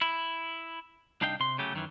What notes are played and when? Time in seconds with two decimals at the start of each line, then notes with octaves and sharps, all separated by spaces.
0.01 E4
1.21 C2 D4 D#4 F5 G5
1.40 C3 C6
1.58 C#3 F#3 A3 G4
1.74 F#2 D#3 E3